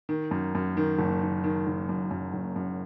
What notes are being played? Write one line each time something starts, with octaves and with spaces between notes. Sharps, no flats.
D#3
F#2
F#2
D#3
F#1
D#3
D#3
F#1
F#2
F#2
F#1
F#2